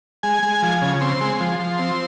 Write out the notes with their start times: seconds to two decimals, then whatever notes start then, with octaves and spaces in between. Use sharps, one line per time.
0.23 G#3 G#5
0.43 G#3
0.62 F3
0.82 C#3
1.01 C4 C6
1.21 G#3
1.40 F3
1.59 F3
1.79 C4